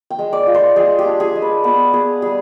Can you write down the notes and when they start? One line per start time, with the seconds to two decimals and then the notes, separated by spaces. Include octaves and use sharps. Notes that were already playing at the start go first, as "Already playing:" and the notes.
0.10 G5
0.19 G#3
0.33 D5
0.47 F4
0.54 C5
0.76 G#3 G#4
0.99 G4
1.05 D4
1.20 G#4
1.35 G#3
1.42 B4
1.64 B3 B4
1.93 B3 G#4
2.22 G3 G#4